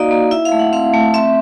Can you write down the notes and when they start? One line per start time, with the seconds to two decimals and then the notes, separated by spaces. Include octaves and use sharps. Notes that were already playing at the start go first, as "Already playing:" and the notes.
Already playing: A#3 D#4 F#4 D5 D#5 F5
0.11 A#3
0.31 E4 E5
0.45 F5
0.52 A3
0.59 F#5
0.73 C4 F5
0.94 A3
1.14 C4 E5